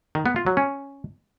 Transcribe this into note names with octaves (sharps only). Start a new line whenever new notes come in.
D#3
B3
F4
F#3
C#4